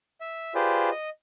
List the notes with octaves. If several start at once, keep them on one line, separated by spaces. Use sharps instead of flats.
E5
F4 G4 G#4 B4 C5 D5
D#5